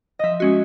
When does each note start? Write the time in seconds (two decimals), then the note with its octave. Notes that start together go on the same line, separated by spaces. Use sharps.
0.19 F3 D#5 E5
0.40 G#3 C#4 F#4